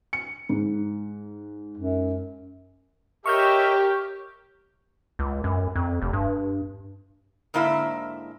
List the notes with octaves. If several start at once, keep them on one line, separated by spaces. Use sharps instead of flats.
C#7
G#2
F#2
G4 A#4 C#5 D#5 E5 C#6 F6 G6
C#2
F#2
F2
F1
G2
G#2 D3 A#3 E4 E5